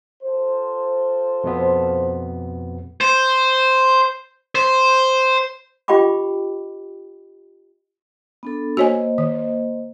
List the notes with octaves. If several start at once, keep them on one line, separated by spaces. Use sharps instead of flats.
F4 A4 C5
F2 B2 B3
C5
C5
F4 G4 D#5 G5 B5 D6
B3 D4 A4
A#3 F#4 C5 C#5 D#5 G#5
D#3